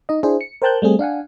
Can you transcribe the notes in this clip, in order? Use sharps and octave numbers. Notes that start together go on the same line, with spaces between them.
D#4 D#5
D4 E4 G#4 C5
C#7
A#4 C5 G5 A5 F#6 G6
G3 A3 C4 G#4
D4 F5 F#5 G#5